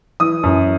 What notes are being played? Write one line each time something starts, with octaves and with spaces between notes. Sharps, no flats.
E3 D#6
F#2